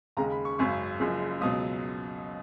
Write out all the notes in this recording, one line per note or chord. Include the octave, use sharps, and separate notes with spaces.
D#2 C#3 G#3 A#5
B5
C#6
G#1 F#2 C#3 F#3 C#6
F#1 F#2 F3 G#3
C#2 B2 F#3 D#6